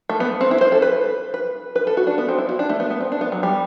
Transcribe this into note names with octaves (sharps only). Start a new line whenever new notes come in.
A3
B3
C4
E4
C5
A4
B4
B4
B4
A4
F#4
D4
B3
C4
E4
F#4
D4
A3
B3
B3
C4
D4
B3
F#3
G3